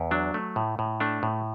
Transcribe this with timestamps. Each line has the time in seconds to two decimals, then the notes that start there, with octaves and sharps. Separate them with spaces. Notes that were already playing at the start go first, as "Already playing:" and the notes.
Already playing: E2
0.11 F#3 D4
0.34 A3
0.56 A2
0.79 A2
1.00 A3 D4
1.23 A2